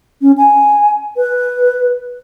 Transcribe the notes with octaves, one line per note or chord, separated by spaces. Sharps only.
C#4
G#5
B4